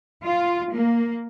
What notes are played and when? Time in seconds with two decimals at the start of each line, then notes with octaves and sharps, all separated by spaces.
0.23 F4
0.72 A#3